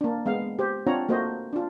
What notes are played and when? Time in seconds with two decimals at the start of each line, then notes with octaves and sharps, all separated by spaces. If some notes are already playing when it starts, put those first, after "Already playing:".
0.01 A#3 D4
0.26 G#3 B3 F5
0.59 G4 C5
0.87 C4 D4 F4 C#5 F#5 A#5
1.09 A3 A#3 F#4 C5 D#5
1.53 D4 F4